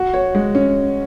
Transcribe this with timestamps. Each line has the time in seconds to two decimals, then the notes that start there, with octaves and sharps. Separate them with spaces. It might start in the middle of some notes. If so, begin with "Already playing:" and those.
Already playing: F#4
0.14 C#5
0.35 G#3
0.55 C#4